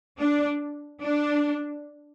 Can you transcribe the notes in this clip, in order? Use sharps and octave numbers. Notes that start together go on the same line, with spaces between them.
D4
D4